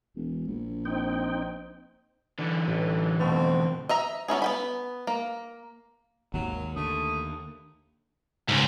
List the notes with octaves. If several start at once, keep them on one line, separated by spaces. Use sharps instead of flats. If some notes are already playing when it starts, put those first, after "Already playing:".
E1
A#1
C4 D#4 G5
D3 E3 D5
A1 B4 G5
F2 B2 A3 C4
D#5 E5 A#5
B3 C#4 E4 G#4
B3 G5 B5
A#3
G#1 D#2 F#3
D3 A3 D#6
C#2 G#2 C#4